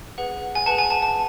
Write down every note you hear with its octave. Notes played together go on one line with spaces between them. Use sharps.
G#4 B4 F#5
G#5
G#4 B4 F#5 A5
G#5
A5
A5